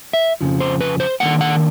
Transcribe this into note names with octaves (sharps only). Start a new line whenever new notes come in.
E5
F2 C#3 F3
C5
B4
C5
D#3 G3 A#3 D4 F#5
F#5